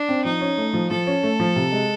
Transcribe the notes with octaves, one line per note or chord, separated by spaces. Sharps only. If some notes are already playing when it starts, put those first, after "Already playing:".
Already playing: D4
C4
F3 D#4
C#4
A3
F3
F3 A4
C#4
A3
F3
C3
G#3